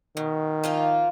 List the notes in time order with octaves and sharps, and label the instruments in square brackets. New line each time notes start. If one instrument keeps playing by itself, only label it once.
[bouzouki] B2 [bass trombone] D#3
[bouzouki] F3 A#3 F4